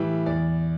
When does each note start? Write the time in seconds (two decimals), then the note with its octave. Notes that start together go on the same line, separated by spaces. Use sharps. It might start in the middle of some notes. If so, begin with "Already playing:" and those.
Already playing: A2 E3 G3 E5
0.26 E2 D5